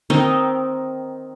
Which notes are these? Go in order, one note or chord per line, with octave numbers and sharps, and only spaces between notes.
D#3 C4 D#4